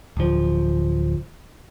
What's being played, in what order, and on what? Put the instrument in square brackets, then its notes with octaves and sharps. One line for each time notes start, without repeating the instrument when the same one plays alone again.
[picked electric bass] D1 F3